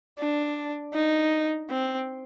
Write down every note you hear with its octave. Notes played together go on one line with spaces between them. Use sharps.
D4
D#4
C4